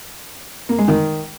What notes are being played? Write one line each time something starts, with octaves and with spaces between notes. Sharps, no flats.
A#3
G#3
D#3